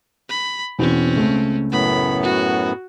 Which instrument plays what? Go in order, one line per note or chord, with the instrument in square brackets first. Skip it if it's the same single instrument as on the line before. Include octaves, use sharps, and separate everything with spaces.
[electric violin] B5
[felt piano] E2 B2 [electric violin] C4 C#4
[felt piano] C#2 A3
[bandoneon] F#2 A2 B3 [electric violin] B5
[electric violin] F#4